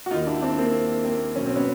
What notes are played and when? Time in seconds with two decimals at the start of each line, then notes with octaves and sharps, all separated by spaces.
0.06 F#4
0.11 D#2 D#3 D#4 F4
0.27 D4 E4
0.42 C4 D4
0.58 A#3 C4
1.04 A#3 C4
1.35 B1 B2 C#4
1.46 C4
1.56 B3 C#4